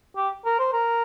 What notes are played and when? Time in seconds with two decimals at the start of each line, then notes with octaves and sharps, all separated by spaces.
0.16 G4
0.45 A#4
0.59 C5
0.73 A#4